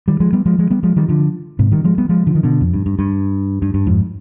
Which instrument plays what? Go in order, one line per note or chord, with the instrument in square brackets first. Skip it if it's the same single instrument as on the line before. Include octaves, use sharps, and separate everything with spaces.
[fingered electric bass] D#3 G3
F3 G#3
G3 B3
F3 G#3
F3 G#3
G3 B3
F3 G#3
D#3 G3
D3 F3
G#2 C3
D#3 G3
F3 G#3
G3 B3
F3 G#3
D3 F3
D#3
B2 D3
F2
G2
G2
G2
G2
G2
F2 G#2